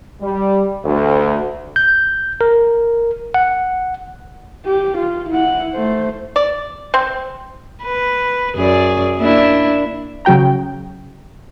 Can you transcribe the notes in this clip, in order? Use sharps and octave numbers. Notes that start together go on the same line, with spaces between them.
G3
D2
G6
A#4
F#5
G4
F4
E4 F#5
A3 C5
D5
C4
B4
F#2 G#4 D5
A#3 D4 E4
C#3 F#3 F#4 G5 A#5